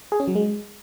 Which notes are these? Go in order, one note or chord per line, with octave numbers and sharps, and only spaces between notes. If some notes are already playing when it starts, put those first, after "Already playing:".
G#4
C#4
F#3
G#3